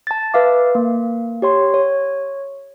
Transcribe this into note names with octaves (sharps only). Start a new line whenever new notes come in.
A5 A6
B4 E5 F5 D6
A#3
G4 C#5 C6
C#5